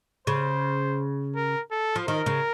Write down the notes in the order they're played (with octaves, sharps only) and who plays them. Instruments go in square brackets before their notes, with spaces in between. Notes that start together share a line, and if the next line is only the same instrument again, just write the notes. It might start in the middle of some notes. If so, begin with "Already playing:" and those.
[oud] C#3 [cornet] C5
[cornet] A#4
A4
[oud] F3
[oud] D#3 [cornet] A#4
[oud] C#3